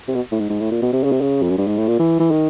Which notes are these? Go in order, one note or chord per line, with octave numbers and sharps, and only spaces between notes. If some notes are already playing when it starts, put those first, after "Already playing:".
C3
B2
A2
G#2
G#2
A2
A#2
B2
C3
C#3
C3
C#3
F2
F#2
G2
G#2
A2
A#2
E3
E3
D#3